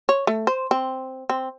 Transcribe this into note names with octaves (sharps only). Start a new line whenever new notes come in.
C#5
A3
C5
C4
C4